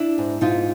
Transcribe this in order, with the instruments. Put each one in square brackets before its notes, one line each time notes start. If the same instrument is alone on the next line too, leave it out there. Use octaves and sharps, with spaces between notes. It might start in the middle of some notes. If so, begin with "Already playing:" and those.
Already playing: [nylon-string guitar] D4 E4
G#2
G#2 D#4 F4